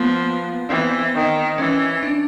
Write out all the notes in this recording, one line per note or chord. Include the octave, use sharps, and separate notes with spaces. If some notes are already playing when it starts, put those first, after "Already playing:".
Already playing: F3 A#3 B3
E3 C4
D#3
E3 C#4
D4